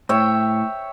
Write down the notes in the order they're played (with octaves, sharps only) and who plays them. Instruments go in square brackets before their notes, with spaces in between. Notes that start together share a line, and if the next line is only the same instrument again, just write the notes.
[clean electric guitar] A2 [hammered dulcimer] C#5 E5 G5